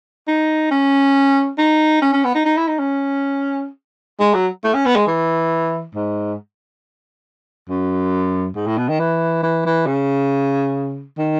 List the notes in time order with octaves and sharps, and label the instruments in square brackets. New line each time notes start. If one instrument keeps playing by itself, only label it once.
[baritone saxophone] D#4
C#4
D#4
C#4
C#4
B3
D#4
D#4
E4
D#4
C#4
G#3
F#3
A3
C#4
B3
G#3
E3
G#2
F#2
G#2
A2
B2
D#3
E3
E3
E3
C#3
D#3